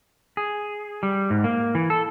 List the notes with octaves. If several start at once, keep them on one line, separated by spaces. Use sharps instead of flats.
G#4
G3
G#2
A#3
E3
A4